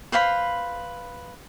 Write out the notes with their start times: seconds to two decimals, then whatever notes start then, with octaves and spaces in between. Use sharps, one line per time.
0.12 B4 C5 F5 B5